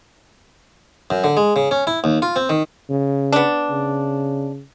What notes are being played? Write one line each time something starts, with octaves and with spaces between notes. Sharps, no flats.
F#2
D3
G#3
C#3
C#4
E4
D#2
F4
C4
D#3
C#3
B3 D4
C#3